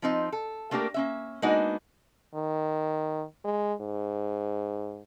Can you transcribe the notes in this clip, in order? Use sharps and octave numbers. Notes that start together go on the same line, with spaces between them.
F3 C4 D#4
A4
A3 A#3 D4 G4 A#4
A#3 C#4 E5
G#3 A#3 B3 D4 D#4 F#4
D#3
G#3
G#2